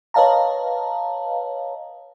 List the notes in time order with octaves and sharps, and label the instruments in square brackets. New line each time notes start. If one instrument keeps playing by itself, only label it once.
[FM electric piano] B4 C#5 D#5 F5 A5 A#5